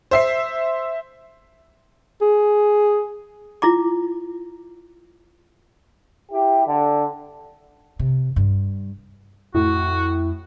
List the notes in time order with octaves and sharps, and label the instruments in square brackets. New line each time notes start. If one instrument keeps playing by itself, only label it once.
[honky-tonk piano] C5 E5 C7
[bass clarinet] G#4
[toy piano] E4 F4 A#5 D6
[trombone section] E4 G4
D3
[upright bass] C3
G2
[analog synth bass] F2 [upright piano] A2 [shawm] F#4